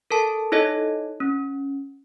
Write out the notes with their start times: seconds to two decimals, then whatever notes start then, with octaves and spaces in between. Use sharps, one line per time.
0.11 A4 A#4 A5
0.52 D#4 E4 A4 C#5 D#5
1.20 C#4